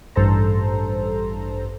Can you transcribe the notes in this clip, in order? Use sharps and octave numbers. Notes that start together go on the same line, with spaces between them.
A1 G2 A4 C5 A#5